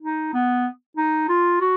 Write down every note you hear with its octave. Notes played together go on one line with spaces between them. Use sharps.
D#4
B3
D#4
F4
F#4